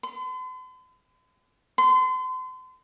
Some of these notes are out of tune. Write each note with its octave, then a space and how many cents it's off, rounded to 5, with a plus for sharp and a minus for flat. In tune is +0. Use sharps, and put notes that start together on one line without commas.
C6 -45
C6 -40